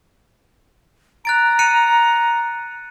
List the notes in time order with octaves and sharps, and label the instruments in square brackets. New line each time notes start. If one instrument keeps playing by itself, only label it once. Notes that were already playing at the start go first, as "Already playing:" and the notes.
[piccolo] A#5 [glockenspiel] F#6 A6 D7
[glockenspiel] F#6 C#7 D#7